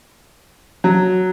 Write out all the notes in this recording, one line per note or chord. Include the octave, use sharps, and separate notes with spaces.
F#3